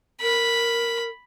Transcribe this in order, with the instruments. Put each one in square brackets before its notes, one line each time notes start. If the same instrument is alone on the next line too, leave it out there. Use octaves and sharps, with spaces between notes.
[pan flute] A#4 [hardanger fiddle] B5